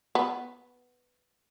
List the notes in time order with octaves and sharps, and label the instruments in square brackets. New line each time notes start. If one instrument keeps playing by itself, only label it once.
[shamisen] B3